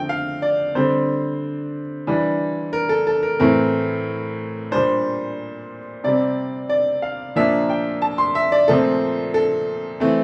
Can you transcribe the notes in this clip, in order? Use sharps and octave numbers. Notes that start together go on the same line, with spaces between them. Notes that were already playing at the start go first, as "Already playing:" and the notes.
Already playing: D3 F3 A3 C4 G5
F5
D5
D3 G3 C4 C5
E3 G3 D4
A#4
A4
A4
A#4
A2 E3 A3 C4 A#4
A#2 G3 D4 C5
C3 G3 C4 D5
D5
F5
A#2 F3 A#3 D4 E5
G5
A5
C6
E5
D5
A#2 F3 A3 C4 A4
A4
E3 A3 C4